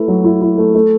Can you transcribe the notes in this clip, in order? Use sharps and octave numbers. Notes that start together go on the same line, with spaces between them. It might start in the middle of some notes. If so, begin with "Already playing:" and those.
Already playing: A3 E4 B4
F#3
E4
E4
A3
A3